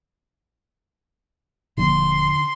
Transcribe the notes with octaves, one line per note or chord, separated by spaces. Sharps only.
D#1 D3 F3 A#3 C6